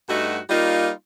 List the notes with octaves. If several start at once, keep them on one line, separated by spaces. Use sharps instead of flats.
G2 A3 D#4 F#4
G3 A#3 D#4 F4